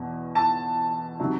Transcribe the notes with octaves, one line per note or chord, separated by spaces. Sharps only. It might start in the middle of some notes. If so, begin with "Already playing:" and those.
Already playing: E2 B2
A5
C3 D#3 F#3